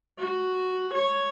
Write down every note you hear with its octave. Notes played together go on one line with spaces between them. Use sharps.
F#4
C#5